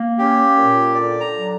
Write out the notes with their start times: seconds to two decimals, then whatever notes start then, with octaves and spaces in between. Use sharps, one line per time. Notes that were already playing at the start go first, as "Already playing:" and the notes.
Already playing: A#3
0.18 C#4 G4
0.57 A#2
0.95 D3 D5
1.21 A#5
1.33 F#3